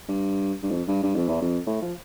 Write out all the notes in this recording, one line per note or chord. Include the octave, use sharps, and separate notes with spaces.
G2
G2
F2
G2
G2
F2
E2
F2
A2
F3